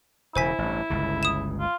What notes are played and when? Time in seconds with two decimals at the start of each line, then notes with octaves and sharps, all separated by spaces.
0.35 E1 C#3 E4 C5 G#5 B6
0.58 A1 G2
0.90 G1 C#2 C#3
1.23 D#6 E7
1.59 F4